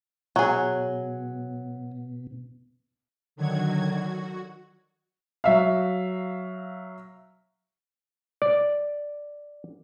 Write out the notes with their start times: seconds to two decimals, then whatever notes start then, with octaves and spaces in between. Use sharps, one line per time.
0.36 B2 F#3 G#4
3.36 D3 D#3 F#3 F#4 G#6
3.90 F#4
5.44 F#3 E5 F5
8.42 D5